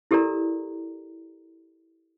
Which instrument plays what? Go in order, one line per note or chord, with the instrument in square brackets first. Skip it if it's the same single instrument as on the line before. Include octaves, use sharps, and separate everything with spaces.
[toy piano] E4 G4 A4 A#4 D5 A#5